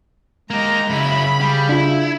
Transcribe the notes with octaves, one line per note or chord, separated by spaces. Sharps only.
G#3 A#3 G4 A#5
F#2 C#3 E4 B5
G3
D4 E4 F4